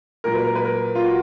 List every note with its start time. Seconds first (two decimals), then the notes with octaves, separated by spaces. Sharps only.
0.24 A#2 F#3 A#4
0.35 B4
0.44 A#4
0.55 B4
0.65 A#4
0.95 F4
1.05 F#4